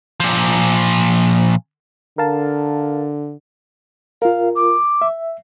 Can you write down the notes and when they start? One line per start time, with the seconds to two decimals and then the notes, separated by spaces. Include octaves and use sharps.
0.20 A#2 F3
2.18 D3 A#4 F5 A5
4.22 F4 A#4 F5
4.56 D6
5.02 E5